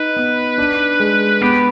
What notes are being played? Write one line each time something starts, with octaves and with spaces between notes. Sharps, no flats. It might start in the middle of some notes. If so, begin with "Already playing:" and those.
Already playing: D#4 B4
B3
D4
G#3
B3 G4